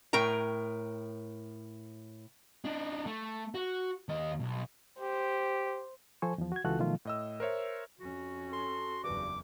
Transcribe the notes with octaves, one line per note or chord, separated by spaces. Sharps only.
A2 A#4 G5 A#5
D4 D#4
A3
F#4
D#2 D#5
B1
G4 C5
F3 A4 C5 G#5 C#6
E2 F3
F#4 G#6
C#2 E3 F4 F#4 A4 F#6
B2 D#3 F3 F#3 A3 F4
A2 D#5 E6
A#4 C5 C#5 E5
F2 C#4 F#4
A4 C6
F#1 E2 G2 D6